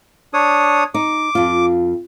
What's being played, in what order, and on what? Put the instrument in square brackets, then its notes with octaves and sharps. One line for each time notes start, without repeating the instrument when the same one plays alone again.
[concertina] D4 C#5 D#6
[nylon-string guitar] D#4 [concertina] D6
[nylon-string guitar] F2 F4